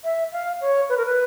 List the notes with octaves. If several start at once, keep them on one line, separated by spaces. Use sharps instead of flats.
E5
F5
C#5
B4
A#4
B4